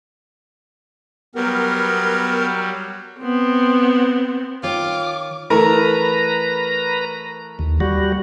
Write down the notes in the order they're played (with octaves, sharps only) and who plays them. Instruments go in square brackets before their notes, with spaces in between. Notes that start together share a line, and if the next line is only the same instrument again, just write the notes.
[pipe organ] F#3 G3 [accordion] B3 A#4
[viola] B3 C4
[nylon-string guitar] D#3 C#5 G5 [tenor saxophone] F4 [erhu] D6
[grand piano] E3 A3 A#4 [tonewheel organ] B4 A#5
[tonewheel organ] D#2
G3 F#4